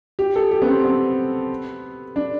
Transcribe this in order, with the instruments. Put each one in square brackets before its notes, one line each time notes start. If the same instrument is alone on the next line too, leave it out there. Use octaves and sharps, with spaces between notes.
[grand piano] G4
A4
G4
B3
C4
B3
D4